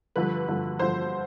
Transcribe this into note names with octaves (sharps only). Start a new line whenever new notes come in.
G2 D3 F3 B4
G2 D3 F3
G2 D3 F3 C5